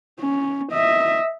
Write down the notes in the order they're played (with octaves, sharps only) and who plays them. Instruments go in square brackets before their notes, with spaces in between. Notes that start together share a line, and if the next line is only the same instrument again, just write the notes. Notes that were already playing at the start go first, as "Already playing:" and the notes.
[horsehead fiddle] C#4
D#5 E5